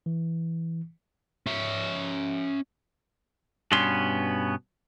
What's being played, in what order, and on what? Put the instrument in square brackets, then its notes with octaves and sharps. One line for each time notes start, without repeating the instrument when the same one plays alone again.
[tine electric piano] E3
[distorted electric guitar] C#4 E5
[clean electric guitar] G2 B2 B3 C#4 C6